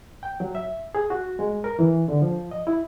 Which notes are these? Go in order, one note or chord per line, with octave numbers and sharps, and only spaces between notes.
G5
F#3
E5
G#4
F#4
G#3
A#4
E3
D3
F3
D#5
E4